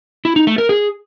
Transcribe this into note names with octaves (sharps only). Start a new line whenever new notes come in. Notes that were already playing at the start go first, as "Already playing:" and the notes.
E4
D#4
A3
A#4
G#4